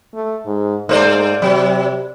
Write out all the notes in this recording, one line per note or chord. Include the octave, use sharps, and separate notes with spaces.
A3
G#2
G#2 A3 C5 D5
C3 F#3